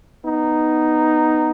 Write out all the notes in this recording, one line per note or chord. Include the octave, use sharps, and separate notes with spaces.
B3 D#4